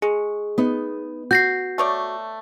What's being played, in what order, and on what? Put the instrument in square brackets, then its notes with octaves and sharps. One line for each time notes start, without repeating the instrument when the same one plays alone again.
[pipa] G#3 [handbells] G#4
[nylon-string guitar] B3 D#4
[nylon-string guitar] F#4 [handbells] G6 A#6 C7
[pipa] A3 C#5 D5